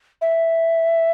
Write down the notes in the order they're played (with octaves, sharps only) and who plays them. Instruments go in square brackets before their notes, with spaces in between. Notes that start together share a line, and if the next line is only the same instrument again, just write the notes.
[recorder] E5